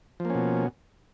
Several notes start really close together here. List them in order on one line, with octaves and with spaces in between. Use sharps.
F3 A#3 C#4 B2